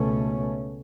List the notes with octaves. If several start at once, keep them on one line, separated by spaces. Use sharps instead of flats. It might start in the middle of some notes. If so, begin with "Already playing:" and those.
Already playing: C#2 B2 A3 C#4